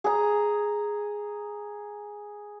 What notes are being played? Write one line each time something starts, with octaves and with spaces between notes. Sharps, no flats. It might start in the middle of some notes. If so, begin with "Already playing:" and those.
G#4 A#5